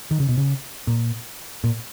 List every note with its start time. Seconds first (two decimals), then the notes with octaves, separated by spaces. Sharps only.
0.11 D#3
0.20 C#3
0.29 B2
0.38 C#3
0.87 A#2
1.64 A#2